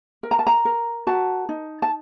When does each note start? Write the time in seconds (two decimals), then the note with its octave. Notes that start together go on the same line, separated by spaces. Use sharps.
0.23 A#4
0.31 A#5
0.39 A5
0.47 A#5
0.65 A#4
1.07 F#4 A5
1.49 D#4
1.82 A5